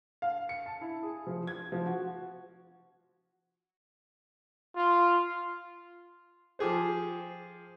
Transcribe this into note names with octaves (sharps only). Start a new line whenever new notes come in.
F5
C#7
A5
E4
G#4
F3
G#6
F3
F#4
F4
F3 G4 G#4 C5